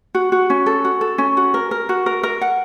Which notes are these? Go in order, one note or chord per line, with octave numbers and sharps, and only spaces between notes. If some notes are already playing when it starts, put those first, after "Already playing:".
F#4
F#4
C#4
A4
F#4
A4
C#4
F#4
A#4
A#4
F#4
A#4
A#4
F#5